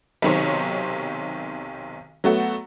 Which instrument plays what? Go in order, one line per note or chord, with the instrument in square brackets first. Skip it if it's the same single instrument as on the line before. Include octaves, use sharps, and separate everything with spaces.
[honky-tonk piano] B1 C3 D#3 C5 C#5
F#3 A3 B3 F#4